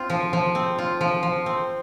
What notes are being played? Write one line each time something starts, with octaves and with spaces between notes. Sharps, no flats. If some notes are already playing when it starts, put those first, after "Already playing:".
Already playing: C4 F4
F3
F3
C4
F4
F3
F3
C4